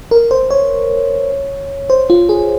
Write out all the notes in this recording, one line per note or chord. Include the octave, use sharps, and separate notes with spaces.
A#4
C5
C#5
C5
F4
G#4